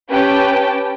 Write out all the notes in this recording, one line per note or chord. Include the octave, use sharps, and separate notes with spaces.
C#4 G4 B4 G5 A5